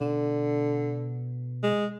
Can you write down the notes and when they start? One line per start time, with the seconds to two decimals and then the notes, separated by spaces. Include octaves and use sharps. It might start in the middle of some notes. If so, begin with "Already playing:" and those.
0.01 B2 D3
1.63 G#3